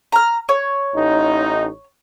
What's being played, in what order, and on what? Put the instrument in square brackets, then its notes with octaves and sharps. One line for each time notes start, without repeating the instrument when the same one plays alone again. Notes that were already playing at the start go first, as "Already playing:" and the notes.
[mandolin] A#5 F6
C#5
[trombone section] A1 D#4